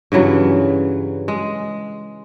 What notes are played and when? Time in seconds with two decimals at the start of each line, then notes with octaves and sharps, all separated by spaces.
0.12 G2 C#3 E3 F#3
1.28 G#3